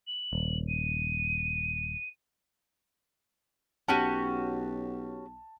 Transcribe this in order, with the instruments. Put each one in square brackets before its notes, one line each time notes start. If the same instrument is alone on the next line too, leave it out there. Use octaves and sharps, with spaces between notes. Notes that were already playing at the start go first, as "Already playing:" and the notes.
[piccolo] F#7
[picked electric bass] D#1
[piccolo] D#7
[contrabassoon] B1 [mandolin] C#4 F#4 G4 [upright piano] A5 D#7